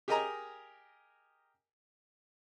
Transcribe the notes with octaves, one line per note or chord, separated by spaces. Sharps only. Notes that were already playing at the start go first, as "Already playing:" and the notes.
G4 G#4 A#4 D#5 G#5 A#5